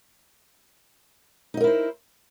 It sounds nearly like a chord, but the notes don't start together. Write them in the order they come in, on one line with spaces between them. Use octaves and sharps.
D#4 D#5 A#4 E4 C5